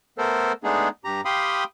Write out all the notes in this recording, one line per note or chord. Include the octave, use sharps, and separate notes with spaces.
A3 B3 A4 A#4 C5
G#3 A3 B3 D4 D#4 G#4
G2 G4 A#5
G4 F5 G5 B5 C6 D#6